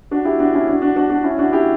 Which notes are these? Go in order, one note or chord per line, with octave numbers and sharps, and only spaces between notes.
D4 F#4
E4 G4
D4 F#4
C#4 E4
D4 F#4
D4 F#4
D4 F#4
D4 F#4
C#4 E4
D4 F#4
E4 G4